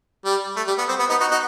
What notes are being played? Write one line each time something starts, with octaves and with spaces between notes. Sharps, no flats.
G3
A3
G3
B3
C4
B3
B3 D#4
D#4 F#4
D#4 F#4